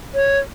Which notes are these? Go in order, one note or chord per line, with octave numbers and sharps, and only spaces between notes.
C#5